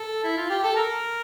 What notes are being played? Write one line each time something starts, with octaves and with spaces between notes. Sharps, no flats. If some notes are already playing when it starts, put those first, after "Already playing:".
Already playing: A4
E4
F4
G4
A4
A#4